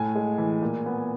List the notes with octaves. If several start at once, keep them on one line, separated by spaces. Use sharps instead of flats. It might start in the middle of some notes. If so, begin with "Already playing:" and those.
Already playing: A2 G#5
G#3
E3
A#2
B3